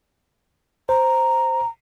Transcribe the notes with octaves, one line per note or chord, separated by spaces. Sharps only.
C5 A#5